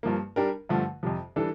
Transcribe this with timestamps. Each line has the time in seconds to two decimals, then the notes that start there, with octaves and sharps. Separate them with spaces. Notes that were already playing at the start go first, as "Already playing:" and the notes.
0.03 G2 F3 A#3
0.36 G3 D4 G4 A#4
0.69 G2 D3 F3 A3
1.03 F2 C3 F3
1.36 E3 G3 D4 A4